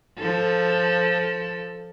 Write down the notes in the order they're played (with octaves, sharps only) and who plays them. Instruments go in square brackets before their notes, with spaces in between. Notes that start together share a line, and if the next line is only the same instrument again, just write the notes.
[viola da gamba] F3 A4